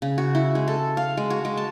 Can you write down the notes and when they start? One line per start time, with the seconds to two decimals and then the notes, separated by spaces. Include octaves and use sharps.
0.02 C#3
0.18 F#4
0.35 E4
0.55 G#3
0.68 A4
0.97 F5
1.17 G#3
1.30 F#4
1.45 G#3
1.57 A5